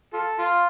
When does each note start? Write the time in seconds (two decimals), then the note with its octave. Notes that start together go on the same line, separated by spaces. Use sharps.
0.13 F4 A4
0.38 F4